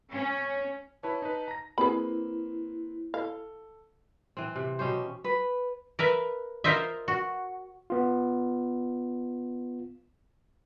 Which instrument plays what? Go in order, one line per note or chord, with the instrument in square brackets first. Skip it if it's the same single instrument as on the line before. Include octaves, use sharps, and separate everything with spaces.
[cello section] C#4
[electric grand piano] E4 B4 C#5 [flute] A5
[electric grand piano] D#4 B4
A#5 A#6
[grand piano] A#3 C4 B4 [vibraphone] E4 [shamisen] G#4 B5
[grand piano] A4 [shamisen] F5
[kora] E3 C4
C3
B2 C#4 G4 C5
[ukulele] B4
[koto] A#4 B4 E5
F4 A#4 C5 D#5 E5
F#4
[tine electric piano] B3 F4